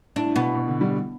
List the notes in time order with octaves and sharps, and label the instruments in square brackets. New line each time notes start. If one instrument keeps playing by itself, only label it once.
[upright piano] A2 [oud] D4
[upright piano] B2 [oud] B3
[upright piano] B2
D3
G3